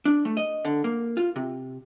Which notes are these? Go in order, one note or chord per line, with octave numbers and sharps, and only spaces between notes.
D4
A3
D#5
D3
A#3
F4
C3